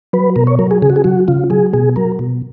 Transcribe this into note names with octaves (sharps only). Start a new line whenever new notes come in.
F#3 B4
B2 A#4
C#5
F#3 A#4
G#4
C#3 G#4
F#4
G#4
F#3 F#4
C#3 F4
F#3 G#4
B2 G#4
F#3 A#4
B2